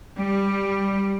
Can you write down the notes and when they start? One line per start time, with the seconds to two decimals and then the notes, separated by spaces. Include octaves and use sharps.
0.15 G3